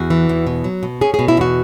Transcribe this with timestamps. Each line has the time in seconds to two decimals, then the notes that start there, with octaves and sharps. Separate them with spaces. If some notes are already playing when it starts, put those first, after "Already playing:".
Already playing: E2 F#4
0.10 E3
0.29 E2
0.47 B2
0.64 F#3
0.83 B2
1.01 C#4 G#4
1.14 B2 G#4
1.28 E4
1.37 E2 F#4